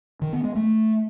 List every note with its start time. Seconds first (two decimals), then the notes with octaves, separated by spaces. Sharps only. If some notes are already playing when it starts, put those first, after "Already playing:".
0.22 D#3
0.33 B3
0.44 G#3
0.55 A3